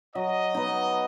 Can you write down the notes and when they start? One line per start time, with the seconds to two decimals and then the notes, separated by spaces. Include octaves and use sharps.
0.15 F#3 D#5
0.55 B3 D#4